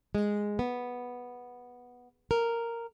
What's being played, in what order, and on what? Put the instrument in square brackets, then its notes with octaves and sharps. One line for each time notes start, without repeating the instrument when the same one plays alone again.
[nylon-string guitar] G#3
B3
A#4